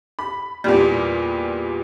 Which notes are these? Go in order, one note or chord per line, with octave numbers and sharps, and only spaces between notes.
B5
E2 A#2 G3